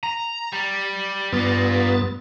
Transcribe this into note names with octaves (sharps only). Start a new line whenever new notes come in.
A#5
G3
G2 B3 F4 D5 A6